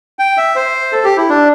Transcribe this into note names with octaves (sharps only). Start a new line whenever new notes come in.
G5
E5
C5
A4
G4
E4
D4